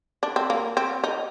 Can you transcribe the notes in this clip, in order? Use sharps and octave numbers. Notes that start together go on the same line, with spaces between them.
D4
C4
A#3
C4
D#4